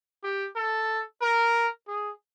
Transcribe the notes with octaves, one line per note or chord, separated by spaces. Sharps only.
G4
A4
A#4
G#4